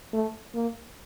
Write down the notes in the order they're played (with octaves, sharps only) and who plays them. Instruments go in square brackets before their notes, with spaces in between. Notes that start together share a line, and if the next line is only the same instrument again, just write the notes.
[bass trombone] A3
A#3